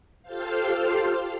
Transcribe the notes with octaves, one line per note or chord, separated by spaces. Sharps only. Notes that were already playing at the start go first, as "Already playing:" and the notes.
F4 G4 A4 C5 F5